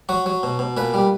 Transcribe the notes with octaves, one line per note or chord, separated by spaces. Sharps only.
F#3 F#4
F#3
B2
B2
A#2 B4
G3